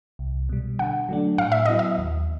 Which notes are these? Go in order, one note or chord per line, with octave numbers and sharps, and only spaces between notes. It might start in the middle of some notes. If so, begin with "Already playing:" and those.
C2
B2 G3
D3 F#5
F#3 A3 D4
A2 F5
E5
F#3 B3 E4 D#5
E5
D#2